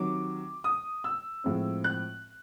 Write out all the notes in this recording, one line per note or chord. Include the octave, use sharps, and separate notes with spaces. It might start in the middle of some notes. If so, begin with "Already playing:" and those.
Already playing: C3 D#3 F#3 D6
D#6
E6
A2 F3 G#3 C4
F#6